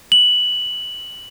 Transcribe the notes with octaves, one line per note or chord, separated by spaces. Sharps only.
F#7